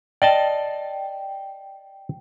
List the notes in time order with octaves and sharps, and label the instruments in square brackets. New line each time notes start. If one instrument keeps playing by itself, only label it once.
[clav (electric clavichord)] D5 D#5 A5 [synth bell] G5